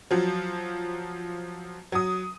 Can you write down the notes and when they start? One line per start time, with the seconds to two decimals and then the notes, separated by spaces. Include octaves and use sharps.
0.11 F3 F#3
1.92 F#3 D#6